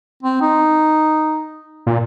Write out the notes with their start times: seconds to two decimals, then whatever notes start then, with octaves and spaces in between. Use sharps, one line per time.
0.23 C4
0.41 D#4
1.87 A#2